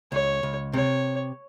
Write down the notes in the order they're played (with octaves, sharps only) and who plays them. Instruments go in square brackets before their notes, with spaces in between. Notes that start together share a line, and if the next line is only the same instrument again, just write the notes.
[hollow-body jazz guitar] C#2 [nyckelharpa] C#5
[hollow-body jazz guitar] C#2
[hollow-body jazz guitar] C3 [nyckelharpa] C#5